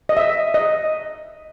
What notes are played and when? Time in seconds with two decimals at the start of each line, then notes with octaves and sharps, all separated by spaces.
0.09 D#5
0.17 E5
0.54 D#5